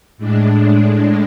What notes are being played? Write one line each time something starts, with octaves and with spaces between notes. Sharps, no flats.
A2 G#3 D4